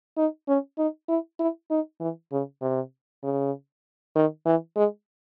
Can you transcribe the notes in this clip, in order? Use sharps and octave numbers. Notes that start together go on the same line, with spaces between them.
D#4
C#4
D#4
E4
E4
D#4
E3
C#3
C3
C#3
D#3
E3
G#3